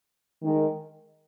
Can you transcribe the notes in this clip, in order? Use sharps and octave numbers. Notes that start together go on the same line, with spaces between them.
D#3 G#3 D#4 A#4